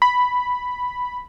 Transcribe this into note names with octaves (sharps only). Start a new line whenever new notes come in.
B5